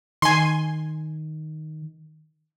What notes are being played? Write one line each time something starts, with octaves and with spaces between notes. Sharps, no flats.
D#3 G#5 C6